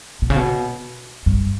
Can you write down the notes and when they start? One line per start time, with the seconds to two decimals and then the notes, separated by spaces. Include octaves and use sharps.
0.22 B2
0.30 C#3
0.36 B2
1.26 G2